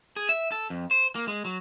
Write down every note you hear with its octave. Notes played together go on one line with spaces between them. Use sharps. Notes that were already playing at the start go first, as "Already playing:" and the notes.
G#4
E5
A4
F2
C5
A#3
G#3
F#3